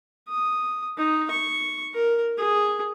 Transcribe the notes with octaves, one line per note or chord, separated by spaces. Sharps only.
D#6
D#4
C#6
A#4
G#4